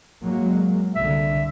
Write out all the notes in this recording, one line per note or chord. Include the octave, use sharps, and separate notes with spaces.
F#3 G#3 A#3
C2 D3 E5